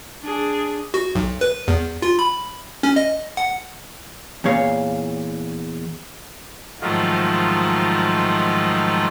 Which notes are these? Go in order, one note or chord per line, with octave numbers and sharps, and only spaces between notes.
D4 G#4
F#4
B1
B4
E2
F4
B5
C#4
D#5
F#5
E2 A#2 C#5 F5
G#2 D#3 F3 F#3 A3 F4